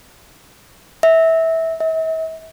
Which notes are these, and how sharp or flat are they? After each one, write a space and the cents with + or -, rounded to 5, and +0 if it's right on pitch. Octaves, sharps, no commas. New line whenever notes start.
E5 -20
E5 -45